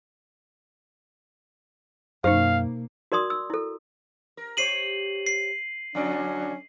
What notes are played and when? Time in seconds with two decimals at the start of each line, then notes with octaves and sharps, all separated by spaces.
2.24 F#2 B2 A#3 D#4 C5 F5
3.12 F#4 A#4 D5 C6 D#6
3.30 E6
3.50 E4 A4
4.37 A#4
4.57 G4 C5 C#5 C7 D#7 F#7
5.27 C7
5.95 F2 D3 F#3 C#4 D4 D5